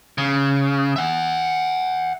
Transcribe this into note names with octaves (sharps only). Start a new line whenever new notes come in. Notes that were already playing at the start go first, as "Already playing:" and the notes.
C#3
E5 F#5